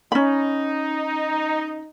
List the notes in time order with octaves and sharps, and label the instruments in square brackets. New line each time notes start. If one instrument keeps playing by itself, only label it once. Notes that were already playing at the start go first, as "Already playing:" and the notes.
[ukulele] C#4 B5 [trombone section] D#4